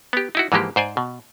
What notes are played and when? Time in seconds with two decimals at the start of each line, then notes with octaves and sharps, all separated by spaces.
0.13 B3 G4
0.35 D#4 E4 F#4
0.52 G#2 E3 F3 G#3 A#3 G4
0.76 G#2 C5 D5 G#5
0.97 B2